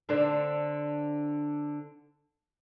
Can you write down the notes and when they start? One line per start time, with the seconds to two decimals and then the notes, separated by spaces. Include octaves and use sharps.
0.09 D3 C4 D4